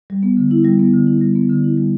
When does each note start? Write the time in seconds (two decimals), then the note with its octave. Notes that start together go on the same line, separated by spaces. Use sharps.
0.10 G3
0.23 B3
0.37 D3
0.51 E4
0.65 G3
0.79 B3
0.94 D3
1.07 E4
1.21 G3
1.35 B3
1.49 D3
1.64 E4
1.77 G3